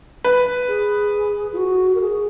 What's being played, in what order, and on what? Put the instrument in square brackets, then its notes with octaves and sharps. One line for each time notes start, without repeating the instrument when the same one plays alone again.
[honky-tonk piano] B4
[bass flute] G#4
F4
F#4
A#4
G#4